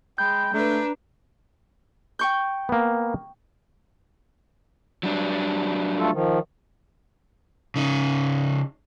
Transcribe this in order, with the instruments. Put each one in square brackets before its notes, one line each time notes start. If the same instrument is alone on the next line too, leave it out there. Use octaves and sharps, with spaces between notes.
[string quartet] G#3 [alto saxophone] G5 [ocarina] B5 [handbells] G6
[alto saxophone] A3 [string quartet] D4 B4 [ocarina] A#5
[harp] G5 C#6 G6
[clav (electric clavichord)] A#3 B3
[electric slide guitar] F#3 G3 D4
[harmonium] A3 F4 A4
D#3 F3
[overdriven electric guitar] C#3 D#4